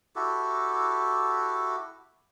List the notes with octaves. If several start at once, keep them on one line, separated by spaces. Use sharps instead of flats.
E4 F#4 G4 A4